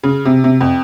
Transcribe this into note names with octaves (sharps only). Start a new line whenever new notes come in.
C#3
C3
C3
F2